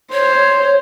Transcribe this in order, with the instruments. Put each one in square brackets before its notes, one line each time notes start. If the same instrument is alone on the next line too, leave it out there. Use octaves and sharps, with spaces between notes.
[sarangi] C5 [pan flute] C#5